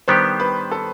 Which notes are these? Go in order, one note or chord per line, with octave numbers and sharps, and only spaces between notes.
D#3 G3 B3 D4 G4 C5
B4
A4